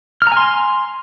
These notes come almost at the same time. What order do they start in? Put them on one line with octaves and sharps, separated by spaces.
F6 A#5 G#5 C6